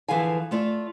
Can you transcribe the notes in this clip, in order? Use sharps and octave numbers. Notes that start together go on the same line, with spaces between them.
D3 E3 F3 G#4 F5 G#5
A3 F4 D5 E5